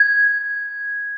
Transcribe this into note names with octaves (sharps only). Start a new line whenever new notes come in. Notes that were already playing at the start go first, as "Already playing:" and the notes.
Already playing: G#6